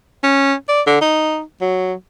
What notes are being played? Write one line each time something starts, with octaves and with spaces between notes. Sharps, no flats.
C#4
D5
D3
D#4
F#3